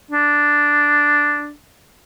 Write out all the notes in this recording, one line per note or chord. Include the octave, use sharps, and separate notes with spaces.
D4